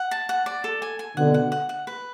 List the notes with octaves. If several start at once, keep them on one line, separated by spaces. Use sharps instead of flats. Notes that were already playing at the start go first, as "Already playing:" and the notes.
Already playing: F#5
A5
F#5
D5
A4
G#5
G#5
B2 D3 F#5
F#5
F#5
F#5
B4